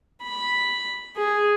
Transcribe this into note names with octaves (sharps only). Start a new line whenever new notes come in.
B5
G#4